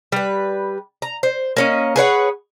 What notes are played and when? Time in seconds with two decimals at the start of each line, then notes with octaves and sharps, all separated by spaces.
0.12 G3 B4
1.02 A#5
1.23 C5
1.57 A#3 C#4 D#5
1.96 G#4 B4 C#5 F#5